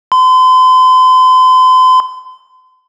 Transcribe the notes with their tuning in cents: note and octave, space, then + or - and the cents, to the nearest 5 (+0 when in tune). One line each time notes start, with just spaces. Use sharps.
C6 -40